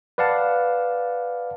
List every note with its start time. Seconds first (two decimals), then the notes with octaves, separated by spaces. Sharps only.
0.18 B4 D5 F5 F#5 A5